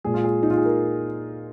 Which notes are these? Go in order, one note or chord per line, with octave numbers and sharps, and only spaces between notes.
A#2 G#3 G#4
F4
G#4
D#4
F4
G#4
A#4